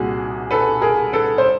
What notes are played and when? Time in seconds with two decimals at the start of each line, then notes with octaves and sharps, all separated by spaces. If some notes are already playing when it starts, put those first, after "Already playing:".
Already playing: C2 A#2 F#4 G#4
0.51 A4 B4
0.82 G#4 A#4
1.13 A4 B4
1.38 C5